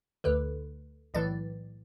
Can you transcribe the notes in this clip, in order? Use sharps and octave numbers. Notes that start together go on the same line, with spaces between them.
D2 D3 B4
B1 A2 E3 D5